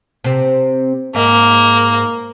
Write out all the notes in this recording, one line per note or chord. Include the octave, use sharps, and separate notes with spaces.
C3 C4
G#2 A#3